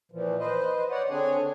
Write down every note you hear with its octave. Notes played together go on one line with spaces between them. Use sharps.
A#2 E3 F3
B4 C5 D#5
C#5 D5 F#5
D3 C4 D4 G#4 C#5 G#5